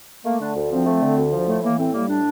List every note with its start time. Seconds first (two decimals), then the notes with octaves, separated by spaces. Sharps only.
0.25 A3 A#3
0.41 D3 D4
0.56 D2
0.71 F3 C4
0.86 A3
1.01 D3
1.17 D2
1.32 F3
1.48 A2 A3
1.63 E3 A#3
1.78 A2 C4
1.93 G3 A#3
2.09 A2 D4